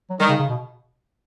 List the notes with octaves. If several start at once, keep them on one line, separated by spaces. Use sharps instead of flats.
F#3
D#3 G3
C#3
C#3
B2